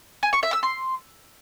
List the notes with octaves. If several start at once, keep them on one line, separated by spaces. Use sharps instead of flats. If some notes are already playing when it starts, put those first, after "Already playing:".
G#5
C#6
E5
E6
C6